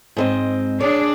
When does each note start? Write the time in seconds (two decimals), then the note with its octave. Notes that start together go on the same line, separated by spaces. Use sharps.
0.17 G#2 C4 D#5
0.81 D4 G#4 C#5 D5